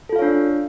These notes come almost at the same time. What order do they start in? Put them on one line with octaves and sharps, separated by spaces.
A4 F4 F5 C#5 D4